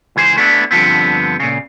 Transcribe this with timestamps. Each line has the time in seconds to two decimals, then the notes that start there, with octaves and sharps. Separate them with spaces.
0.16 C#2 E3 G#4 C5
0.36 A3 B3 D4 E4
0.71 G2 D3 F3 B3 C4
1.40 A#2 C#3